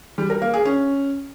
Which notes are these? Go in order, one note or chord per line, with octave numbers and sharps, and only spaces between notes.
G3
A#4
A#3
G#4
C#4